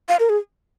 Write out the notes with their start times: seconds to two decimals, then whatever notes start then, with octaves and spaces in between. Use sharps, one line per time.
0.09 F5
0.20 A#4
0.29 G#4